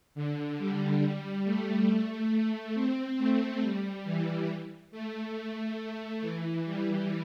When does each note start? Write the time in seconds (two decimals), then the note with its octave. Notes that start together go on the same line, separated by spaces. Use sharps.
0.15 D3
0.58 G3
1.45 A3
2.74 C4
3.18 A3
3.61 G3
4.04 E3
4.91 A3
6.22 E3
6.65 G3